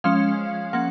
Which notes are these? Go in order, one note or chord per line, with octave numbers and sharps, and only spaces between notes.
F3 G#3 C#4 F5
F3 A#3 C#4 F#5